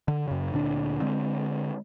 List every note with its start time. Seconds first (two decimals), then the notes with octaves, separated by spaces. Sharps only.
0.08 D3
0.28 F#2 C#3
0.53 D2 A#2 D3 D4
1.01 D3 G#3 C4